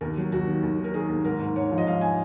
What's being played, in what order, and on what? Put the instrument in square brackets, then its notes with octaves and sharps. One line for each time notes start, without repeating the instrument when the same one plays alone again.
[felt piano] D#2 A#4
F#3
D#2 F#4
D#3
D#2
D#3
A#4
D#3 G#4
D#2
G#2 A#4
G#2
G#2 C#5
F3
D#5
G#2 F5
G#5